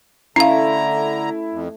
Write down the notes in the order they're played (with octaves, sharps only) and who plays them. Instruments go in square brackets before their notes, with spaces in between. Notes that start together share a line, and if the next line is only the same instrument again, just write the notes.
[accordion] D3 A#5 [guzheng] A3 [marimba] C#4 F5 [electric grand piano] E4
[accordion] F2